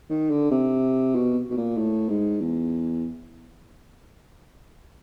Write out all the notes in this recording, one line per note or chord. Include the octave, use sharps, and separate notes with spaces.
D#3
D3
C3
B2
B2
A#2
A2
G#2
E2